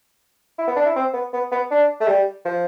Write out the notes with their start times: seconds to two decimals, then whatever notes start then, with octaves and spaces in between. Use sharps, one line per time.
0.59 E4
0.68 B3
0.76 D4
0.86 E4
0.96 C4
1.14 B3
1.33 B3
1.52 B3
1.71 D4
2.01 A3
2.08 G3
2.45 F3